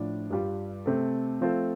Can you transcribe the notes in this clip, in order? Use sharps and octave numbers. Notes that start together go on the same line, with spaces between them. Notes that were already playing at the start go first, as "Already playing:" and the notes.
Already playing: A2 F3 D4
G2 G3 F4
C3 A3 C4 A4
F3 A3 C4 F4 A4